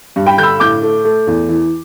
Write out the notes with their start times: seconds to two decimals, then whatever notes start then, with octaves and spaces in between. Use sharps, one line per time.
0.16 G2
0.26 G5 B5
0.38 D3 G6
0.43 B5 E6
0.60 A2 D6 G6
0.82 A3
1.05 A3
1.27 E2
1.48 E3